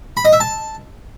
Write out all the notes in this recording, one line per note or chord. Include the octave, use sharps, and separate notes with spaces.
B5
D#5
E5
A5